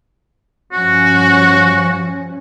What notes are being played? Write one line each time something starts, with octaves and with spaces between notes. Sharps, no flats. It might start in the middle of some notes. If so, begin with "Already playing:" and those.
G2 F3 C#4 F#4